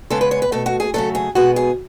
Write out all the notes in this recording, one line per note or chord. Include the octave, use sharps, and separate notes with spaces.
C#3 G#3 B3 A4
B4
C#5
B4
B2 A3 A4
F#4
G#4
C#3 F#3 A3 A4
G#4
B2 G#3 B3 F#4
G#4